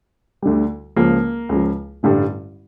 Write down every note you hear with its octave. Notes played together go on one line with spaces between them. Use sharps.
D2 D3 G3
C#2 C#3 F3 A#3
C#2 C#3 F3
A1 G2 D3 G3